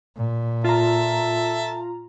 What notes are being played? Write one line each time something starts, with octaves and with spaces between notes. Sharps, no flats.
A#2
F4 A4 E5 A5 A#5